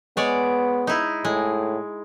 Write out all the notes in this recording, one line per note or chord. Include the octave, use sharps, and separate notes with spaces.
G#3 B3 C#5 D5
D#4 E4
A2 G#3